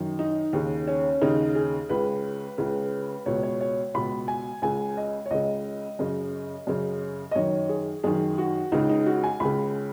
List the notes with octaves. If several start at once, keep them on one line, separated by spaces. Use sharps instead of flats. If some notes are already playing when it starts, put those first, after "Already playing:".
Already playing: F#2 D#3
D#4
D#2 C#3
C#4
D#2 C#3 D#4
G#4
C#2 C#3 B4
C#2 C#3
C#2 B2 C#5
C#5
C#5
C#2 B2 B5
G#5
C#2 C#3 G#5
D#5
C#5
C#2 C#3 D#5
F#2 C#3
F#2 C#3
D#5
F#2 D#3 C#5
G#4
F#2 D#3 G#4
F#4
C#2 C#3 D#4
D#4
F#4
G#5
C#2 C#3 B5